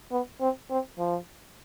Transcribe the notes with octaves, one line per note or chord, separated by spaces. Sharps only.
B3
C4
C4
F3